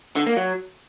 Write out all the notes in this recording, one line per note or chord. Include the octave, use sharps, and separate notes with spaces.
D3
A#3
F#3